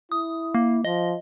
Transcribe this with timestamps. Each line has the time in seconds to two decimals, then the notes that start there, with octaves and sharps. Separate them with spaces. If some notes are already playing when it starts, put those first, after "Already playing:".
0.12 E4 D#6
0.55 A#3
0.85 F3 D#5